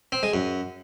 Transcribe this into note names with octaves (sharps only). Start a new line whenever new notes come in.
C4
G#3
F#2